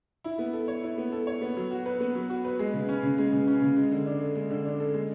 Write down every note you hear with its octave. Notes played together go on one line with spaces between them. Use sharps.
E4
B3
A4
C#5
E4
B3
A4
C#5
B3
F#3
F#4
B4
B3
F#3
F#4
B4
G#3
C#3
C#4
C#3
G#3
C#3
C#4
C#3
G#3
D3
D4
A4
G#3
D3
D4
A4
G#3